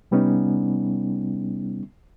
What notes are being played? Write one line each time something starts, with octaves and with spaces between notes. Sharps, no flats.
C3 G3 B3 C#4 D#4